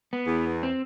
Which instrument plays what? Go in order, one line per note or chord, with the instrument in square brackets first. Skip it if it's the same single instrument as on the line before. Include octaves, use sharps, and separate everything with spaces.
[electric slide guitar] B3
[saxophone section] E2
[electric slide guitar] C4